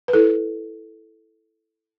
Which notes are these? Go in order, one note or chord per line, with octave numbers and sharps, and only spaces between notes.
B4
E4 A4